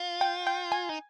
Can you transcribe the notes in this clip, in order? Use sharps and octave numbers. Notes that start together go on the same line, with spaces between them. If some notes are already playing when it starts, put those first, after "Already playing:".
Already playing: F4
G5
G5
G#5
D#4